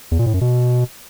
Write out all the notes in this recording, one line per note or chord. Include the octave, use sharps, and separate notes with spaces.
E2
A#2
A2
F#2
B2